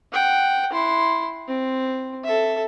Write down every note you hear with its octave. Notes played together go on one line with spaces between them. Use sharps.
F#5 G5
E4 C6
C4
A4 E5